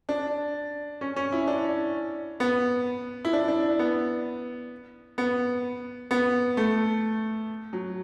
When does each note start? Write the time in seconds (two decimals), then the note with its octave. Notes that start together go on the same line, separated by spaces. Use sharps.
0.09 D4
1.01 C#4
1.16 C#4
1.32 E4
1.47 D4
2.40 B3
3.25 E4
3.33 D4
3.48 D4
3.79 B3
5.18 B3
6.11 B3
6.57 A3
7.73 F#3